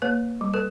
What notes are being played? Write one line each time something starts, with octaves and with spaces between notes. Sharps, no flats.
A#3 B4 C#5
G3
A4 B4